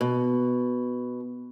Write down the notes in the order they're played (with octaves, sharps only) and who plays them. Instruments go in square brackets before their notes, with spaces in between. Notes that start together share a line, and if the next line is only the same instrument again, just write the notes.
[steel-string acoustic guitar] B2